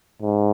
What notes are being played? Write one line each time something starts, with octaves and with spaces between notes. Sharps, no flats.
G#2